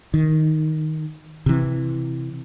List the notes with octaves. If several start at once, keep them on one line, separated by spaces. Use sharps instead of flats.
D#3
C3 E3